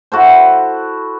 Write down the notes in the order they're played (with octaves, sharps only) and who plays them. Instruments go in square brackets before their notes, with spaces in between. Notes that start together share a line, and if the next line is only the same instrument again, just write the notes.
[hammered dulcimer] E4 F#4 A4 C5